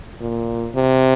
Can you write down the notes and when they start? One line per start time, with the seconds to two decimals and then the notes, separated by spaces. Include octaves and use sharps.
0.21 A#2
0.75 C3